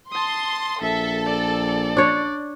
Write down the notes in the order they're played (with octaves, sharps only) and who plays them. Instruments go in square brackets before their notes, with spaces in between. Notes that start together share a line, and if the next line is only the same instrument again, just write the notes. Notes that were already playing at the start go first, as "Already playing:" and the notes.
[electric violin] A5 D#6 [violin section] C6
[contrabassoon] A#1 [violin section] A4 [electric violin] E5
[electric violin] D5
[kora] D4 C#5